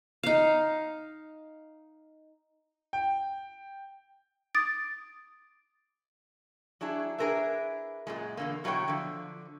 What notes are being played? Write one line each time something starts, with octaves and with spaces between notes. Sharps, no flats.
D#4 F5
G5
D6 D#6 A6 D7
F#3 D4 E4 G#4
D4 G#4 A#4 B4 E5
F#2 A#2 G#3
E2 D3 A#3
B2 F#3 E4 F#4 C#5 G5
D3 F3